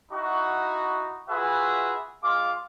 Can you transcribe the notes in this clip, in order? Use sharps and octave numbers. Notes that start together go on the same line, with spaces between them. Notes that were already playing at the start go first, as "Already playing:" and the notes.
D#4 E4 F#4
F4 F#4 G#4 B4 E5
G#3 F4 F5 D6